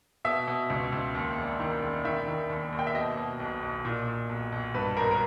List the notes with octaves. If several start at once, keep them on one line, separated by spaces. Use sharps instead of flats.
B2 E5
B2
C#2
C#2
D#2
E1
D#3
E1
D#3 E5
D#3
D#2
D#2
G5
E5
B2 D#5
B2
B1
B1
A#2
A#2
B1
B1
G2 B4
G#1 A#4
A#4